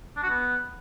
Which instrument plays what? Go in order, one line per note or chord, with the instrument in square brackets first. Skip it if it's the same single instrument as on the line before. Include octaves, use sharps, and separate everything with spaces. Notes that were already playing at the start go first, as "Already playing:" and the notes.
[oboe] D4
F#4
B3